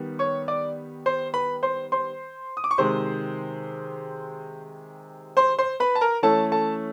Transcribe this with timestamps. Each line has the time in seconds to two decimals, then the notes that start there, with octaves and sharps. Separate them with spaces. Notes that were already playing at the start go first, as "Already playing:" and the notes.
Already playing: D#3 G3 B3
0.19 C#5 C#6
0.48 D5 D6
1.06 C5 C6
1.34 B4 B5
1.63 C5 C6
1.92 C5 C6
2.57 D#6
2.64 D6
2.71 C#6
2.78 C3 D#3 G#3 C5 C6
5.37 C5 C6
5.59 C5 C6
5.80 B4 B5
5.95 A5
6.01 A#4 A#5
6.23 E3 A3 C#4 A4 A5
6.52 A4 A5